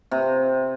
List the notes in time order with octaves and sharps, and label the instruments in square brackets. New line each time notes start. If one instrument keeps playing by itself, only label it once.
[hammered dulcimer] C3